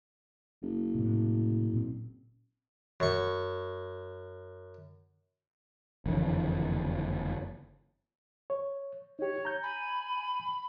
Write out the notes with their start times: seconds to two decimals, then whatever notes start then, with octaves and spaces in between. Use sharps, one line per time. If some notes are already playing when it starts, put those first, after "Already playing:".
0.62 F#1
0.95 A2 C3
1.73 A#2 C4
3.00 F#2 C#6
6.06 F#1 F2 D3 E3
8.50 C#5
9.19 D#4 G4 C#5
9.45 A#5 G6
9.63 G#5 B5